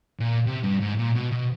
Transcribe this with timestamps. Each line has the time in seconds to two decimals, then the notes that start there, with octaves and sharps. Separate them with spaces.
0.19 A#2
0.46 C3
0.63 G2
0.81 G#2
0.98 A#2
1.15 B2
1.32 B2